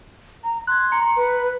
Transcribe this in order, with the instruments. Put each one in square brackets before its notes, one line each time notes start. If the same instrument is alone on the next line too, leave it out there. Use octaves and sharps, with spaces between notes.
[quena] A#5
[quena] C6 [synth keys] F#6 G#6
[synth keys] A#5 C#7
[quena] B4